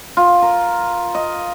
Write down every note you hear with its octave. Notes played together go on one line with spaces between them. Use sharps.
F4
A#4
D#5